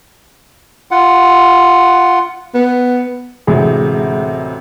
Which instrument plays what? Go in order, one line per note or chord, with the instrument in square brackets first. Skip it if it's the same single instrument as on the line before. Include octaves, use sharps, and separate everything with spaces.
[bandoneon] F4 F#5
[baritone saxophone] B3
[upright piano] A1 D2 C3 [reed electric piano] G#3 G#4